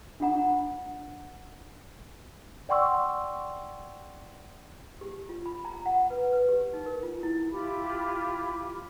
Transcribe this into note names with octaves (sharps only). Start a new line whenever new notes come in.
D4 F4 F#5 A#5
D5 F#5 G5 C6 C#6 E6
G4
F4
B5
A#5
F#5
B4
B4
G4
D#4
A#4
F4
E4
E4 F4 G4 B5